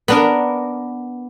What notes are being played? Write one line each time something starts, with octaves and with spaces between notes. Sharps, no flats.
B3 D4 A#4